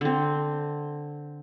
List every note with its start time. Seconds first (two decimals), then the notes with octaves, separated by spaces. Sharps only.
0.01 D3 C4